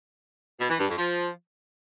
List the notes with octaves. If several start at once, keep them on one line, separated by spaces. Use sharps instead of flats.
B2
E3
G2
F2
F3